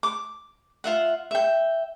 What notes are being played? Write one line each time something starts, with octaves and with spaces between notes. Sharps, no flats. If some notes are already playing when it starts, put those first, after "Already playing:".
D6
F4 E5 F#5
E5 G5